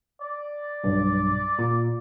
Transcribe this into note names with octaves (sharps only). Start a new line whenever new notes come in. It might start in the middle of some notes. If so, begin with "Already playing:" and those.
D5
B1 G2
A#2